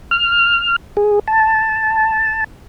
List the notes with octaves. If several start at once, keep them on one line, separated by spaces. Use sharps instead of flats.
F6
G#4
A5